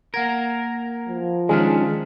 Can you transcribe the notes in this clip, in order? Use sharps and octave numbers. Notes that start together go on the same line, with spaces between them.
A#3 A#4 F#5 G#6
F3
D#3 G#3 C#4 D4 G#5 F6 B6